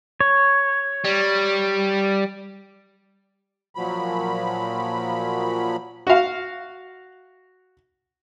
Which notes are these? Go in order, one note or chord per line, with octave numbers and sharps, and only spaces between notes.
C#5
G3
A#2 F3 F#3 B5
F#4 F5